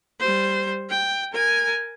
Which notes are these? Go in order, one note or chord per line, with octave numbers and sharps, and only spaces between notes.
G3 C5
G5
A#4 G#5